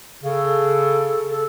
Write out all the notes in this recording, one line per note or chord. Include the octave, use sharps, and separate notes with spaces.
C#3 A4
A4